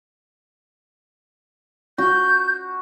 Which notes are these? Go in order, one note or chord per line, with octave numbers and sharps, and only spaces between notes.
F#4 G6